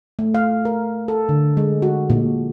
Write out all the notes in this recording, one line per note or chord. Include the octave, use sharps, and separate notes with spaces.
A3
F5
A#4
A4
D3
G#3
F#4
A#2